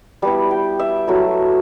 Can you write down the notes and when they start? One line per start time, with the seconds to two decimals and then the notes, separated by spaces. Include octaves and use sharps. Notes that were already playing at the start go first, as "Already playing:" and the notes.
0.22 G3 B3 E4 A5
0.51 G5
0.79 E5
1.07 F#3 A3 E4